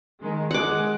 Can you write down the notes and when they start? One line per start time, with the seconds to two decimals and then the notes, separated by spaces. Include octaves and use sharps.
0.20 D#3 G#3
0.51 G#3 F#5 D6